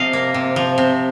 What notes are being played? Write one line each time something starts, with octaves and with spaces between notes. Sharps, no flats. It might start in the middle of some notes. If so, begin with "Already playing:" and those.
Already playing: C3 F3 D#5 F5
A#3
C3
F3
C3